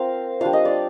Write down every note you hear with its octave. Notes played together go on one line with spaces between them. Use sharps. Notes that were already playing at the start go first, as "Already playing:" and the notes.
Already playing: C4 F4 A#4 C5 F5
G3 D4 F4 F5
D#5
D5